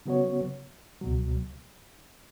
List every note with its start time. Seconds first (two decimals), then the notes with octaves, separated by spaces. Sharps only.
0.06 C#3 F#3 B3 F#4 C#5
1.02 C#2 B2 F#3